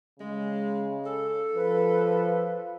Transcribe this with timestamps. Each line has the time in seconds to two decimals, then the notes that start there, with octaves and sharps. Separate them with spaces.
0.19 C#3 G#3
1.06 A4
1.55 F3 B4